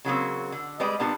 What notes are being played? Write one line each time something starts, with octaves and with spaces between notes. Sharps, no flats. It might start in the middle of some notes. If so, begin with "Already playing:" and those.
C#3 F#3 A#3 C4
D3
G3 G#3 B4 D5
A#2 G3 B3 D4 B4